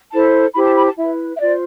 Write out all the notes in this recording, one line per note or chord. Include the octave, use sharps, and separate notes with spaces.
E4 A4 C5 A5
E4 G4 C5 B5
A5
B5
A5
E4 B4 E5
E5
F4 C5 D5